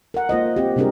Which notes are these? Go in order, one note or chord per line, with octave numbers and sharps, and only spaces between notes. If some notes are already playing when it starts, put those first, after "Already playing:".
A#4 F#5
A#3 F4 C5 D#5
C4 G4
C3 G3 D4 G4 G#4 A#4